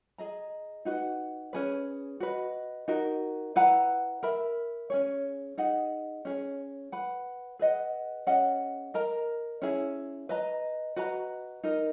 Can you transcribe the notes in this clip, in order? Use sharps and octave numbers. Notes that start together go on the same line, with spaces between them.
G#4 D#5 A#5
D#4 F#4 B4 F#5
C#4 G#4 B4
F#4 B4 D#5
D#4 F#4 A#4
E4 B4 F#5 A#5
A#4 E5 B5
C#4 G#4 C#5
D#4 G#4 D#5 F#5
C#4 G#4 C#5
B4 F#5 B5
G#4 B4 D#5 F#5
C#4 G#4 D#5 F#5
A#4 D#5 A#5
C#4 E4 G#4
B4 D#5 A#5
F#4 B4 D#5 A#5
D#4 A#4 D#5